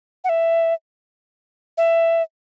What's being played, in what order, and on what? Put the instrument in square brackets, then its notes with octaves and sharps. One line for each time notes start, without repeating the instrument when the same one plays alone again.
[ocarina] F#5
E5
E5